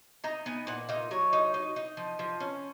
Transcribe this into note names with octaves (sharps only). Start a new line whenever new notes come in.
D#4 A#5
B3 G#5
A#2 F#5
D#4 F5
F#3 C#5
D#4
D#4
D#4
F3
F3
C#4